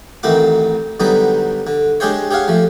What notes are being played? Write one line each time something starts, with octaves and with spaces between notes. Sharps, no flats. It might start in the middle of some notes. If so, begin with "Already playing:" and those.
A1 D#3 A3 C4 F#4 D6
D3 F#3 G3 B3 D#4
D3
G#3 D4 G4 G#4 C5 C#5
G4 G#4 C#5 F5 F#5
F3 A3